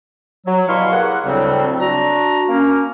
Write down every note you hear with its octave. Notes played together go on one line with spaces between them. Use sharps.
F#3
B2 G3 E4 F5 C6 C#6
A#3 G#4 F#5
D2 A2 C#3 F#3 G3 C4
D4 F#4 A#5
A#3 C#4